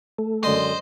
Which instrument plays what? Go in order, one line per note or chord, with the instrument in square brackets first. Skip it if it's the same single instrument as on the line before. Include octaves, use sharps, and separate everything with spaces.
[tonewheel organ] A3
[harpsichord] F#2 D3 G#3 [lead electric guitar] C5 [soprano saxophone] D#5